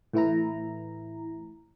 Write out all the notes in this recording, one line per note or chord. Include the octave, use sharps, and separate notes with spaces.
A2 E3 E4 A#5